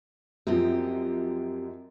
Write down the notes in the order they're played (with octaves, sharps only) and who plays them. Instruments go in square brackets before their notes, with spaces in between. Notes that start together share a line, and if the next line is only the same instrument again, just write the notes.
[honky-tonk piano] F#2 F3 [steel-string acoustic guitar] C4 G4 D#5